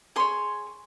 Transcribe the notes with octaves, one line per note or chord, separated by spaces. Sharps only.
G#4 C#5 C6